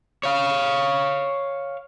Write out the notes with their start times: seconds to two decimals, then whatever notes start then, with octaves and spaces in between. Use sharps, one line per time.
0.23 C#5 F5